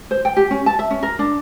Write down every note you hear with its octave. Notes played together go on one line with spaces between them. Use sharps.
C5
G5
G4
C#4
A5
E5
C#4
A#4
D4